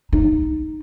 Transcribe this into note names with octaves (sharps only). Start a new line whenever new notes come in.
D#4